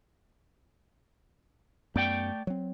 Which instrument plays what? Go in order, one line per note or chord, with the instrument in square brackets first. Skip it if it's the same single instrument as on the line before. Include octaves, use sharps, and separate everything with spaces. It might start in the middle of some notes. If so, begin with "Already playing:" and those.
[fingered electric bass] F#2 B3 [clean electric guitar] A3 D5 G5
[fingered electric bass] F#3 C4